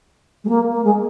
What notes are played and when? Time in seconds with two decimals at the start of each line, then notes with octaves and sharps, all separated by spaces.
0.44 G#3
0.49 A#3
0.72 A#3
0.84 G#3